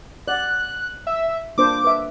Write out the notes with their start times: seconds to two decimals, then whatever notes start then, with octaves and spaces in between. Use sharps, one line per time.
0.28 D5 F#5 F#6
1.07 E5
1.58 A#3 D4 C5 D6
1.84 B4 E5